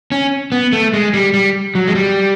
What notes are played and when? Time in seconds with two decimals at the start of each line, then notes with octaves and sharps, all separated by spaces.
0.12 C#4
0.52 B3
0.73 A3
0.93 G#3
1.14 G3
1.34 G3
1.75 F#3
1.88 G#3
1.95 G3